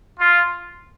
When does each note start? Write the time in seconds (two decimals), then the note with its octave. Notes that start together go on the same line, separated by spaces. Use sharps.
0.20 F4